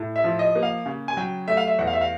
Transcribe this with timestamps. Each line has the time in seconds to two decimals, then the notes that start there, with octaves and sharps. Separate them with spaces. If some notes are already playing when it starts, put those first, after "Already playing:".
Already playing: A2
0.16 E5
0.24 F3
0.39 D#5
0.56 A#3
0.63 F5
0.86 C#3
1.08 G#5
1.17 F#3 G5
1.48 A3 E5
1.57 F5
1.67 E5
1.79 E2 F#5
1.87 F5
1.93 E5
2.01 F5